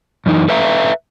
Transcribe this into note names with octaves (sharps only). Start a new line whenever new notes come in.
F#2 E3 D#4
A4 B4 E5 F5 G#5 A#5